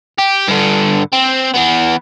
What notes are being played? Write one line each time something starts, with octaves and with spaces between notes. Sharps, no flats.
G4
G2 D3
C4
E3 B3